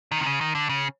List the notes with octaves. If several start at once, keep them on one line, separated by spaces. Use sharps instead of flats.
D#3
C3
C#3
D#3
D3
C#3